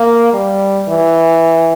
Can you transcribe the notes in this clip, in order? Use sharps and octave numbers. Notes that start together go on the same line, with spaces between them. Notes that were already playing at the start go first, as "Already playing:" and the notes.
Already playing: A#3
G3
E3